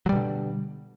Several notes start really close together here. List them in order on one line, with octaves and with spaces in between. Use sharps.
F#3 G3 B2 D3